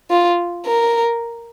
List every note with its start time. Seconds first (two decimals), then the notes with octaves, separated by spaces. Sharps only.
0.11 F4
0.67 A#4